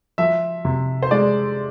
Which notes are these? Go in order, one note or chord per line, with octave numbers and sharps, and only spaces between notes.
F3 E5
C3
C5
G#3 D5